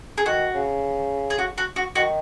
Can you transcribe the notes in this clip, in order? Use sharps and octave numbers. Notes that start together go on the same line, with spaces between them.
G#4
D#3 F#4
C#3
G#4
F#4
F#4
F#4
D#3 F#4